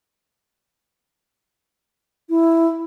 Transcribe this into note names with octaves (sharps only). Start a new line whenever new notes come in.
E4